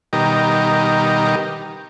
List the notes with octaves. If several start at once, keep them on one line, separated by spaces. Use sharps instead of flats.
B2 D#3 G3 D#4 G4 A#4